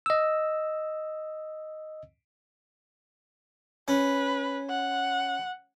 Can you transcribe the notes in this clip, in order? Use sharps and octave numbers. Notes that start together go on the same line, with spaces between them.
D#5 E6
C#4 B4
F#5